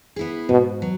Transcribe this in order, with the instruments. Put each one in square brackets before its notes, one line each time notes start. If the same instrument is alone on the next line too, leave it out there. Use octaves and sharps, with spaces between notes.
[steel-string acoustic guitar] B3 E4 G#4
[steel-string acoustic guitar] G#2 [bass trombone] B2
[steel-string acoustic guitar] F#3